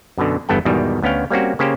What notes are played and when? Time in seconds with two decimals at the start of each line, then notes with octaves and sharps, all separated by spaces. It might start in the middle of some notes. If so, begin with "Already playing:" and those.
0.18 F#2 B2 D3
0.49 G1 E2 G2 B3 A4 G5
0.65 E2 G#2 B2 D#3 G3
1.02 D2 B3 C#4 F5 G5
1.31 G3 A#3 C4 C#4 F#4
1.59 C#3 A#3 C#4 G4 C5